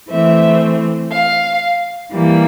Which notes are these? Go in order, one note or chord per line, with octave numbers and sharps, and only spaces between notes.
E3 A3 C4 E5
F5
E3 G3 A#3